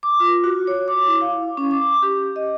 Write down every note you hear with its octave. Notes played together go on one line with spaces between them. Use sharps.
D6
F4
F#4
C#5
D6
E4
F5
C#4
D6
G4
D#5